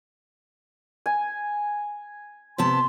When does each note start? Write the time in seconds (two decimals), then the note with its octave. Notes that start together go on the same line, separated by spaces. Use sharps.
1.06 G#5
2.58 C3 B3 A5 C6